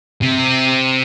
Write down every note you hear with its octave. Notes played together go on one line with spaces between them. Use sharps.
C3